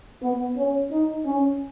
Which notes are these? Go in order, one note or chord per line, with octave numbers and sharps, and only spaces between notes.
B3
C#4
D#4
C#4